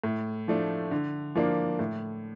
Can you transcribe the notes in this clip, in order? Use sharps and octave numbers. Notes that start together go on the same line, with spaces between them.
A2
F3 A3 D4
D3
F3 A#3 D4
A2